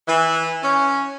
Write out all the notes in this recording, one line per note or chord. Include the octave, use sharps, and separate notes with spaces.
E3
C#4